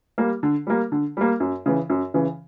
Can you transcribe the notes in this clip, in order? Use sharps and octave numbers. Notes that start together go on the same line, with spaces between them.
G3 A#3
D3
G3 A#3
D3
G3 A#3
F#2
C#3 E3
F#2
C#3 E3